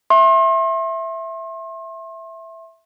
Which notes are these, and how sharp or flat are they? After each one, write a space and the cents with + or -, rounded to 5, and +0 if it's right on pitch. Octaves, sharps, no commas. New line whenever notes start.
E5 +0 C6 +40